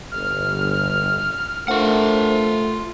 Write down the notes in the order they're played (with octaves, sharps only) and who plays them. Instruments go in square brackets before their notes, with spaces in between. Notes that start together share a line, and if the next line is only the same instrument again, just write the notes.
[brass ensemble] G1 [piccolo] F6
[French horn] A3 [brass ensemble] D4 A#4 C5 [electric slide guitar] F4 F#5